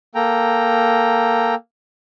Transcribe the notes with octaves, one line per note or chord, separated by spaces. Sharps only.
A#3 A4 G5 A#5